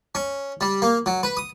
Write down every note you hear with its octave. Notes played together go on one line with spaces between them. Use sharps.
C#4
G3
A#3
F#3
B4
D#6